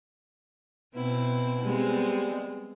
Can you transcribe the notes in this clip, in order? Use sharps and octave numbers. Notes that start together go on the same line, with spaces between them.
B2 B3 C4 E4
G3 G#3 B3 C4